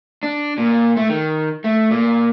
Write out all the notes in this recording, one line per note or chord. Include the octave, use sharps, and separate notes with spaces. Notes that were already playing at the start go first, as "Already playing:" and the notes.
D4
A#2
A3
D#3
A3
A#2